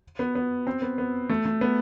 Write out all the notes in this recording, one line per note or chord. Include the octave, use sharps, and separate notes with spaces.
B3
B3
C4
B3
B3
A3
A3
B3